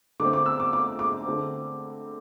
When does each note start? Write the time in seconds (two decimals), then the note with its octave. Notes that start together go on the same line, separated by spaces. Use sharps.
0.20 D3 A3 C4 D6
0.33 D6
0.46 E6
0.60 D6
0.73 D6
0.99 D6
1.26 D3 A3 C4